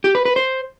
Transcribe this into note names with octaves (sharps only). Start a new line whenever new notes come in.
G4
B4
B4
C5